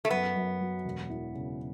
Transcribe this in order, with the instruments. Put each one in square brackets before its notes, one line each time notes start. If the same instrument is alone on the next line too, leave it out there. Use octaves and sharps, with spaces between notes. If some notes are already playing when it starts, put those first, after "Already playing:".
[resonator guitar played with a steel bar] A3
[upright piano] F#2 [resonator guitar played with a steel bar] B3
[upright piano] F#2
F#3
E1
E3
C#3